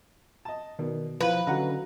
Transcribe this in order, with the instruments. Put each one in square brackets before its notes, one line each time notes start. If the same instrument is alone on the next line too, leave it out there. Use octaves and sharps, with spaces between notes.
[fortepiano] D#5 A5
[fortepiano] B2 [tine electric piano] D#3 [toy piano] D5
[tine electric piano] F3 [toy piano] E4 F5 [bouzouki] B4
[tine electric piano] D3 C#4 [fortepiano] F#3 F#5 A#5 [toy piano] D#5 C#6